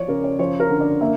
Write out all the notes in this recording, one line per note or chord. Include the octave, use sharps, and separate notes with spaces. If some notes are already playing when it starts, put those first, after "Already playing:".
Already playing: F3 C#5 D5
C#3 A#4
C#5
F3 C#5
A#4
D3
D5
A#3 E5